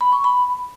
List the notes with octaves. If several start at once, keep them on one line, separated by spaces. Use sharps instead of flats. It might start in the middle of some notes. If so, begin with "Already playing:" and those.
B5
C#6
B5